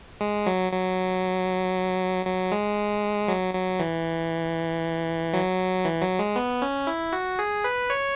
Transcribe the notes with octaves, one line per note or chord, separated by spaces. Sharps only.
G#3
F#3
F#3
F#3
G#3
F#3
F#3
E3
F#3
E3
F#3
G#3
B3
C#4
E4
F#4
G#4
B4
C#5